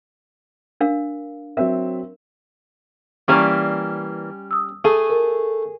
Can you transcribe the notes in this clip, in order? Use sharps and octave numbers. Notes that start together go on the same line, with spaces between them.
D4 A#4 F5
F#3 C4 A#4 E5
E3 G3 A#3 C#4 D5 C#6
D#6 E6
A3 G#4
A4 A#4